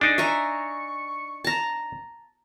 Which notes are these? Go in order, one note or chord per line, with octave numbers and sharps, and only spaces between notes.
D4 D#4 G#4
E5 G#5 A#5 C#6
A5 A#5